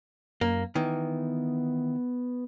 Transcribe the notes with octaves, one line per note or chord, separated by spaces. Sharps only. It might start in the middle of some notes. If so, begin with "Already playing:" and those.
F#2 A#3
D#3 E3 B3